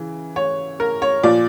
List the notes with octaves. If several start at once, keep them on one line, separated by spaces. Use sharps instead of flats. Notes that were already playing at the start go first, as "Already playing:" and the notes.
Already playing: C#3 E3
C#5
A#4
C#5
A#2 F3 D5